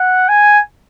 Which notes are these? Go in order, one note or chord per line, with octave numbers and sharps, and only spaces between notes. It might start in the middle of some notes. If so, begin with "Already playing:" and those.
Already playing: F#5
G#5